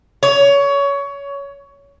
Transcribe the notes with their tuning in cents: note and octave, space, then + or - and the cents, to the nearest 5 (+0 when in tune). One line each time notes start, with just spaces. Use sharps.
C#5 +20